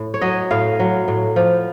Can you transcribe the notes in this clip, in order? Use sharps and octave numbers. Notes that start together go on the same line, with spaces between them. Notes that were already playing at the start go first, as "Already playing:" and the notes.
Already playing: A2
C#5
F#3 D#5
A2 F5
F#3
A2
F3